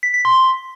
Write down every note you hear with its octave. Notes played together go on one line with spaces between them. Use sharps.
B6
B6
C6